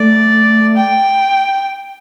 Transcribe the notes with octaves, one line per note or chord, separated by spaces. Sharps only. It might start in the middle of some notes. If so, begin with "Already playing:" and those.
Already playing: A3 D5
G5